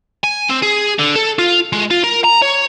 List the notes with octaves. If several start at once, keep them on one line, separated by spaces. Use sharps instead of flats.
G#5
C4
G#4
D3
A4
F4
G#3
F4
A#4
A#5
C#5